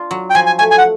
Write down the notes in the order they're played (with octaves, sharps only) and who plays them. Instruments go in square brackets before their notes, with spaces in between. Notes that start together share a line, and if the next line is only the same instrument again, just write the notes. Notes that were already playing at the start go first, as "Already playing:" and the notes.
Already playing: [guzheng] D4 F4
F#3
[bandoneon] G5
[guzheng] F3 [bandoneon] G#5
[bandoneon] G#5
[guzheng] A3 [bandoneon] G#5
[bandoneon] G#5
F#5